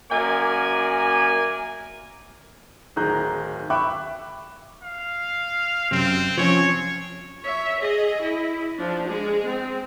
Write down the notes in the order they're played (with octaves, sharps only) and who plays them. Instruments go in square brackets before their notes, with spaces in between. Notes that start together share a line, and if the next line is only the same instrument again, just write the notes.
[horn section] F#2 A#3 D5 G#5
[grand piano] D1 D#3 G#4 A#5 F#6 G6
E5 G5 B5 C#6 D6 F#6
[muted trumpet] F5
[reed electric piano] F#2 C3 [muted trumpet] C4
[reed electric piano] F3 C4 C#4 [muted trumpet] C#5
[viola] C#5 E5
G#4 D#5
E4
F3 D4
G#3 G#4
C4